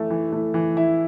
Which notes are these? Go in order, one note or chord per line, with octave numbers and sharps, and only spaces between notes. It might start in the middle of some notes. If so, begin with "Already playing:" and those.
Already playing: E3 A3
E3
A3
E3
E4